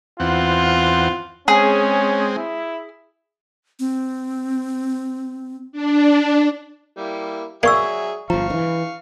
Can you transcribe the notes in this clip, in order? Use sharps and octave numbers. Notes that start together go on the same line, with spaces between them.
E2 C4 F4 F#5
G#3 C4 C#4 G#4
E4
C4
D4
G3 A#3 E4
F#3 A#3 G#4 D5 E5 C#6 E6
G1 F3 F5 A#5 C#6
D#3 E3